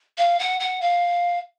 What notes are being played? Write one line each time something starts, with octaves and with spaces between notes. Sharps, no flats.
F5
F#5
F#5
F5